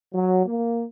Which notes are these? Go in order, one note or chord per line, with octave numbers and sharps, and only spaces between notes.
F#3
A#3